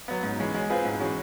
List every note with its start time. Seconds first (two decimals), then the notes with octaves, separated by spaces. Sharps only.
0.08 F#3 B3
0.23 G#2
0.39 E3 G#3 C#4
0.54 G#3
0.70 C4 F4 G#4 B4
0.85 G#2
1.00 E3 G#3 C#4 F#4